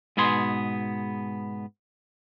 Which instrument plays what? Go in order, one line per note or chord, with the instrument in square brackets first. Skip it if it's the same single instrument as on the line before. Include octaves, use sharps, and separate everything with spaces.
[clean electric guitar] G#2 B2 B3 G#4 C6